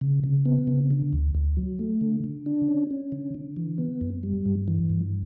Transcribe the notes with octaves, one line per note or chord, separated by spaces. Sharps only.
C#3
C#3
B3
C#3
D3
D2
D2
F#3
A3
D3
D3
D4
C#4
C#4
D3
D3
E3
B3
F#2
G3
G2
E3
G2